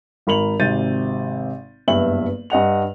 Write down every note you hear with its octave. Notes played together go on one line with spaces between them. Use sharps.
G#1 A#4 B5 F7 F#7
G#1 C3 G6 A6 D#7
F#1 G2 B3 E5 F#7
G2 D#5 F#5 F7